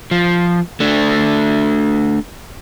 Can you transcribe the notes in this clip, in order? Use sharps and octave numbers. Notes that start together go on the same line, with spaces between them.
F3
A3 D4